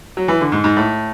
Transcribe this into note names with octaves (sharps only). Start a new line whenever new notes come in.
F#3
E3
D3
G#2
G#2
A2